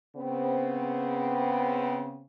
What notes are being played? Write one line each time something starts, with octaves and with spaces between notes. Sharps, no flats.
C#3 B3 C4